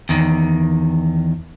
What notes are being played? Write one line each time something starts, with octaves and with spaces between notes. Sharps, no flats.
E2 D#3